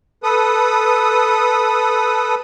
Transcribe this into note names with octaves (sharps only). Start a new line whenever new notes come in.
A4 B4 D#6